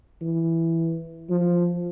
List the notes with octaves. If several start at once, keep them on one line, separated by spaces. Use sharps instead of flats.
E3
F3